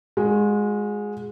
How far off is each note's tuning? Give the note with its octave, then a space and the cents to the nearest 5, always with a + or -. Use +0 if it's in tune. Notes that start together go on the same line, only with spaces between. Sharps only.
G#3 +0 F#4 -40